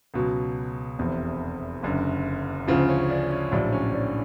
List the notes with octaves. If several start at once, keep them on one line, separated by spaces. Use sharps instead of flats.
C#2 B2 F#3
F1 E2 C3
F#1 F#2 D3
D2 C#3 F3 F4
C#4
D4
C#4
A#1 A2 F#3 D4
C#4
D4